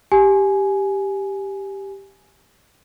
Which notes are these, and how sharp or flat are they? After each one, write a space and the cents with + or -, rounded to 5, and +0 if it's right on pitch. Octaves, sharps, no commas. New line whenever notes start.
G4 +0 G#5 +15